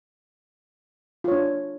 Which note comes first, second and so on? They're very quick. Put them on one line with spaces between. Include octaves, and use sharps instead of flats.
F4 C#5 D4